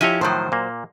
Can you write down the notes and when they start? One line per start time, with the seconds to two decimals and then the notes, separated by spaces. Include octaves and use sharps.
0.01 F3 E4 G4 C#5 D#5 G#5
0.21 A2 D#3 F3 F#3 C5
0.52 A#2 A#3